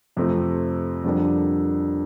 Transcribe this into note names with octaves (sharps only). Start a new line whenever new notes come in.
F2 C3 F3 A3 C4
F2 D3 G3 A#3 D4